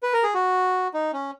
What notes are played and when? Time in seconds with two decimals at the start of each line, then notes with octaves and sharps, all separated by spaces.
0.03 B4
0.13 A#4
0.23 G#4
0.34 F#4
0.94 D#4
1.13 C#4